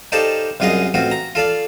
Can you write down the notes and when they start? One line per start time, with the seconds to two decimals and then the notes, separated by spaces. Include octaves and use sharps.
0.12 D#4 G4 A4 C5 D5 F5
0.60 C2 F#2 F4 G#4 D#5 F5
0.94 A1 C4 F4 F#4
1.11 A#5
1.35 F4 A4 D5 F5